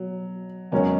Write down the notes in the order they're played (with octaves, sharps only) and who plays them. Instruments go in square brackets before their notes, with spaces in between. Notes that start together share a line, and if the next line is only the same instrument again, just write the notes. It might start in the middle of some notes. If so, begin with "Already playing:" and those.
Already playing: [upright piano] B2 [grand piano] F#3
[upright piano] E2 D#3 G#3 C#4 [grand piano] F#3